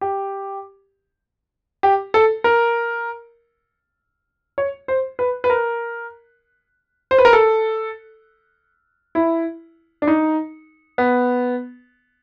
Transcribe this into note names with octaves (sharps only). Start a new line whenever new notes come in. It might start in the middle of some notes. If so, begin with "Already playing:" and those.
G4
G4
A4
A#4
C#5
C5
B4
B4
A#4
C5
B4
A#4
A4
E4
D4
D#4
B3